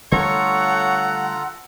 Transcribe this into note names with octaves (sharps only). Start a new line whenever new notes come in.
D3 G3 A3 F4 A4 C#5 F#5 A#5